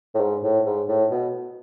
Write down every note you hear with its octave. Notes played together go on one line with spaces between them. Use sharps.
A2
G#2
A2
G#2
A2
B2